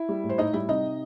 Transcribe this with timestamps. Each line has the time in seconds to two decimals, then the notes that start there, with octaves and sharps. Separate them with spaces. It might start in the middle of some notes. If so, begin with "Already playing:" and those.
Already playing: E4
0.09 G3
0.24 A2
0.29 C5
0.38 A2 D#4 D#5
0.53 G3 E4 E5
0.68 C3 D#4 D#5